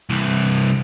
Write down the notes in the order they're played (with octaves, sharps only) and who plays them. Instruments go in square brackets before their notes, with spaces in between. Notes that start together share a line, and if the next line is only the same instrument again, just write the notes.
[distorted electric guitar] C2 E3